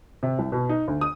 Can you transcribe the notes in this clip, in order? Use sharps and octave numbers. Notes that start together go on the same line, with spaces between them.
C3
C2
B2
D#4
D2
D#6